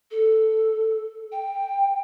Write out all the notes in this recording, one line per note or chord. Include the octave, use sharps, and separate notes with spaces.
A4
G5